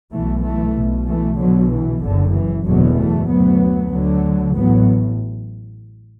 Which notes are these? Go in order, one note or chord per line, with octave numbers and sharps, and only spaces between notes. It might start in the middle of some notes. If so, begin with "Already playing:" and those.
B1 B2 E3 A3
E3 A3
B1 B2
E3 A3
B1 B2 D3 F#3
E3
F#1 F#2 D3
E3
F#1 E2 B2 D3 F#3
E3 A3
D2 F#3 B3
D2 D3 F#3
A1 A2 F#3 B3